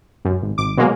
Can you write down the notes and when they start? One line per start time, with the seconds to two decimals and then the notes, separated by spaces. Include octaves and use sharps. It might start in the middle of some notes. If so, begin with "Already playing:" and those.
0.25 F#2
0.42 G#1
0.58 G#1 D6
0.77 B2 F#3 G#3 A#3